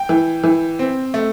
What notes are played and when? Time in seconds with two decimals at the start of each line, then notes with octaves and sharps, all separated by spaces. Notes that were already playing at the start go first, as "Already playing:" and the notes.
Already playing: G5
0.09 E3
0.44 E3
0.79 C4
1.14 A3